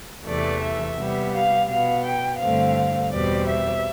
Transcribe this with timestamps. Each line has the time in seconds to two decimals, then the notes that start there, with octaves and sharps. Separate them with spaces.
0.26 E2 C3 E3 A3 D5
0.61 E5
0.97 C3 G3 B3
1.33 F5
1.68 B2 B3 F5
2.04 G5
2.40 G2 D3 A3 C4 F5
3.12 E2 B2 G3 C4 D5
3.48 E5